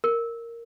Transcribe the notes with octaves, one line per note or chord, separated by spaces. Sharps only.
A#4